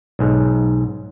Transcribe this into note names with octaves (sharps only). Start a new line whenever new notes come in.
B1 G#2